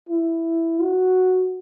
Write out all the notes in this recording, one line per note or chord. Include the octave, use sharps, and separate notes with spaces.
E4
F#4